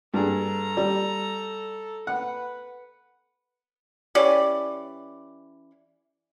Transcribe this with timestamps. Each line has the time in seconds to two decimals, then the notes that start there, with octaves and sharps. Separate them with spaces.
0.14 G2 G#4 A4 A#5
0.77 G3
2.07 B4 F#5
4.15 E3 C#4 G4 D5